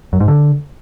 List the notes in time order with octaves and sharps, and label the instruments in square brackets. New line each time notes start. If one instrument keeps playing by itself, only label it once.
[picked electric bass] F#2
G#2
D3